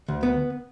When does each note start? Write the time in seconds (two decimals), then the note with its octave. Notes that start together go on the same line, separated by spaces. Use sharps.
0.08 D2
0.23 B3